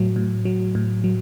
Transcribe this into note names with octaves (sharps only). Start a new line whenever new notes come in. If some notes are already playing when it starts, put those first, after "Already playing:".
Already playing: A2 F#3
A2
F#3
A2
F#3